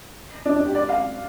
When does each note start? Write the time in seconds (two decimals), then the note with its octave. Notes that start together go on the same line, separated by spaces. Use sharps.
0.45 D4
0.56 D4
0.65 G4
0.75 D5
0.89 F5